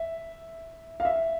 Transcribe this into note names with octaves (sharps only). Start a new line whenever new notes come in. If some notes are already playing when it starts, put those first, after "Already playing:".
Already playing: E5
F5
E5